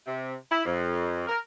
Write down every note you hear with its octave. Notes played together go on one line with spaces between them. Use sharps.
C3
E4
F2
A#4